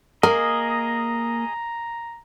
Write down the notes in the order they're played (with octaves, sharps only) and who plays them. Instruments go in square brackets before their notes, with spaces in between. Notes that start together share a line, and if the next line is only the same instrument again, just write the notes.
[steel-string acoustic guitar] A#3 [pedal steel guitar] G#4 D#5 [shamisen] A#4 [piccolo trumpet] A#5